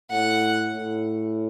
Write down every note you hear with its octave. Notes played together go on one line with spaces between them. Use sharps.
A2 F#5
A2